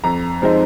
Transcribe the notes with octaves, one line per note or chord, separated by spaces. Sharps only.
F2 A#5
F3 G#3 C4 D#4